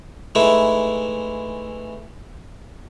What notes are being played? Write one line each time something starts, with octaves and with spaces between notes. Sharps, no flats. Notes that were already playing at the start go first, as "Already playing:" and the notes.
E3 G#3 A3 D#4 E4 B4